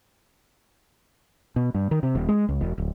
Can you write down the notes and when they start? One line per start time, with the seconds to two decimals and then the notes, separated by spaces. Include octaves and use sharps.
1.56 B2
1.75 G2
1.91 D#3
2.03 C3
2.15 D#1
2.29 G#3
2.49 C#2
2.61 E1
2.78 D1